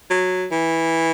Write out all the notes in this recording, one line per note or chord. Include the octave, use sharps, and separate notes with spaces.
F#3
E3